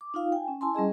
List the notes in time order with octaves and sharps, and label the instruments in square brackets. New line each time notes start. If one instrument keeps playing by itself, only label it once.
[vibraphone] D6
D#4 F4 F5
G5 G#5
C#4
E4 G#5 A5 C6
G3 C#4 G#4 D#5